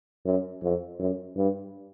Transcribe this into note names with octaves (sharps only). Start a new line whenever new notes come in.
F#2
F2
F#2
G2